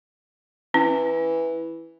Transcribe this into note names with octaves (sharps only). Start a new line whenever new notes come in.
E3 C#4